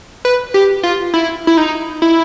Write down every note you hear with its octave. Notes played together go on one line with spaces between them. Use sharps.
B4
G4
F4
E4
E4
D#4
E4